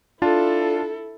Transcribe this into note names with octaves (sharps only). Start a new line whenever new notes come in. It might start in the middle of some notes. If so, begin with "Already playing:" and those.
D4 E4 F4 A4 A5